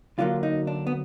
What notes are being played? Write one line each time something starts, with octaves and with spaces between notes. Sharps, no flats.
D2 D3 F#3 A#3 F4
D#4
D4
B3